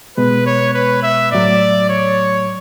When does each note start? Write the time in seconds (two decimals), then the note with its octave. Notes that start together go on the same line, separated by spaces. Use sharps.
0.17 B2 G#3 B3 B4
0.46 C#5
0.74 B4
1.03 E5
1.32 A2 F#3 A3 D5
1.89 C#5